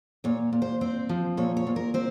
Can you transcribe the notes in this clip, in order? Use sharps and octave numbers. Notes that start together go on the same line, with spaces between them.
A#2 C#5
A#2
C5
C4 C5
F3
A#2 C#5
C#5
A#2
A#4
C4 C5